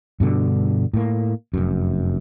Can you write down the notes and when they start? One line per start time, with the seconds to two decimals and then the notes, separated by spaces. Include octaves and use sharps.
0.20 G2 B2 D3
0.93 A2 A#3
1.54 F1 F#2